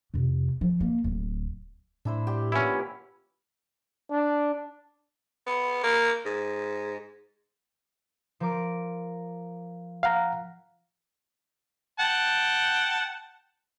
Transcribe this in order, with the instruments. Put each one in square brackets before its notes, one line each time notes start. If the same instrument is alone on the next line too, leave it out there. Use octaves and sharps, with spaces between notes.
[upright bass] F2 C3
F3
A#3
D1
[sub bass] A2 [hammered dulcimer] D4 E4 C5
[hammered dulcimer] G4 D5 C6
[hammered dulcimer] A#2 E3 B3 [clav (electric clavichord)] C#4 E4
[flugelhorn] D4
[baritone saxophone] B3
A#3
G#2
[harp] F3 A#4 D6
[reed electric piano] F5 F#5 A#5
[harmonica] F#5 G5 A5